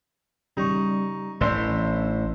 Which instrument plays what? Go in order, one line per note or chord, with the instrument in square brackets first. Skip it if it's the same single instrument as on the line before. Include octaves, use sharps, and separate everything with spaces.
[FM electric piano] C#3 G3 [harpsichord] D#4 C#6
[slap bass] A1 [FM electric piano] E3 C#4 D4 [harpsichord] C5 E5